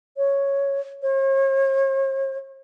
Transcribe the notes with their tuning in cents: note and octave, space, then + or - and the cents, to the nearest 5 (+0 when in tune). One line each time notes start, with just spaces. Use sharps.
C#5 +0
C#5 -45